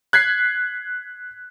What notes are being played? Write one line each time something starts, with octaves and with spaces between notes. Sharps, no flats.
F#6 G#6 B6 C7